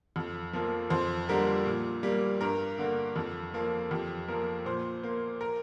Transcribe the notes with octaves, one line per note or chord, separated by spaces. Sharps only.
F2
F3 A#3
F2 C5
D3 G3 A#3 A#4
A#2
G3 A#3
G2 A#4
D3 A#3
F2
F3 A#3
F2 G4
F3 A#3 A#4
A#2 C5
A#3 C5
A#4